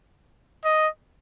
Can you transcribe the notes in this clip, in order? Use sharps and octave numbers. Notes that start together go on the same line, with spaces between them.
D#5